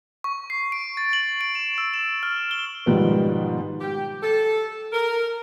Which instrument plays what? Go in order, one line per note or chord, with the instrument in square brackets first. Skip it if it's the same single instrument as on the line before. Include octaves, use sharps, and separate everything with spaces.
[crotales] C#6
C7
D7
A6
F#7
D7
E7
E6
E7
F6
G7
[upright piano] G#2 B2 D#3 F3 G3 B3
[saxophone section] G4
A4
A#4